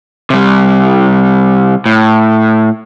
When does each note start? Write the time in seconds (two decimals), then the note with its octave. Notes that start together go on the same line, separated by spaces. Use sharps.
0.30 C3 G3
1.86 A2